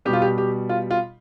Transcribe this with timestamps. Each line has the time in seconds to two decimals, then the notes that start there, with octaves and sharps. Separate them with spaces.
0.05 B2 G3 G4
0.13 F4
0.22 G4
0.38 G4
0.69 F4
0.91 F4